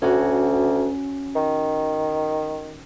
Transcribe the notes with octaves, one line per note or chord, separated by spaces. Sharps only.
D2 C#4 F#4
D#3